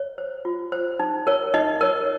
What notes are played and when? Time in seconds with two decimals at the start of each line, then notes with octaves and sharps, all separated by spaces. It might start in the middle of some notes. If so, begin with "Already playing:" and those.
Already playing: C#5
0.18 C5
0.45 F4
0.72 C5
1.00 D#4
1.27 A#4 C#5
1.54 D#4 D#5
1.81 A#4 C#5